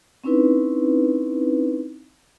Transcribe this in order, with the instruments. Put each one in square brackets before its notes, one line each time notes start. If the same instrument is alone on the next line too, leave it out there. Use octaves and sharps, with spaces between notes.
[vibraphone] C4 C#4 D#4 E4 B4